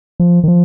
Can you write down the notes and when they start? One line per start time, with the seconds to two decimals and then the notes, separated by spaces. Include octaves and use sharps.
0.20 F3
0.44 D#3
0.48 F3